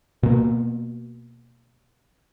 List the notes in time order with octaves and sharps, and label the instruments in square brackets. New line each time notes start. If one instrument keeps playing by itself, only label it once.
[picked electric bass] B2 A#3